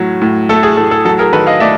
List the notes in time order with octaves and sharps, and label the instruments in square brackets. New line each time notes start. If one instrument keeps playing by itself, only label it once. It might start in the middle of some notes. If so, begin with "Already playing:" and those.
Already playing: [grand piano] A2 F#3
A2
A3 A4
G#4
A2 A4
A4
F#3 A4
G#4 A#4
D#3 A4 B4
D#5 F5
A3 D5 E5